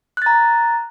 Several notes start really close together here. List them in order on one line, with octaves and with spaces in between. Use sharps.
F#6 A6 A#5